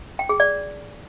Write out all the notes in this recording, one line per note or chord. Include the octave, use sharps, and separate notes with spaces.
G5
G#4
D5